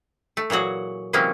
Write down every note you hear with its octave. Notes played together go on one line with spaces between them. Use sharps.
A3
A#2 E3 F#3 F#4 G#4
C3 E3 F#3 G#3 A#3 C#4